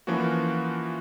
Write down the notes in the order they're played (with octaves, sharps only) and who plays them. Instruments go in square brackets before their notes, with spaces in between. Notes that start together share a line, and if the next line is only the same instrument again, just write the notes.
[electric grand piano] E3 F3 A#3 C#4 F#4